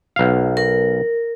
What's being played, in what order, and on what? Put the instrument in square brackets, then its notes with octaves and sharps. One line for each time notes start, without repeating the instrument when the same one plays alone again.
[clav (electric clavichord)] B1 F5
[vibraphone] A#4